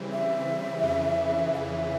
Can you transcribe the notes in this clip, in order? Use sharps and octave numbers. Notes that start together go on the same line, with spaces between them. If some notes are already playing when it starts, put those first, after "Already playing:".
Already playing: C#3 E3 G3 C4
E5
F2 C#3 E3
F5
E5